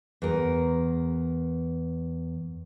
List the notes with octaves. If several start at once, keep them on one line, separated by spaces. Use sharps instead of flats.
E2 A#4